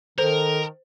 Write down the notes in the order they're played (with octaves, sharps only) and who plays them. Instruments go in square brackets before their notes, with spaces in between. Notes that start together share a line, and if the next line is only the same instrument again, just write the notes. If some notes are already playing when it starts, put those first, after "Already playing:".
[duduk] D#3 [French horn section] A4 [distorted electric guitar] A#4 [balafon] C5